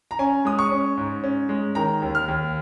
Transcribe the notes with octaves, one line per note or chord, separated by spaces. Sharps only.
A#5
C#4 G#5
G#3 D#6
C#6
C#4
G#2
C#4
G#3
D#3 A#5
D#2
F6
D#2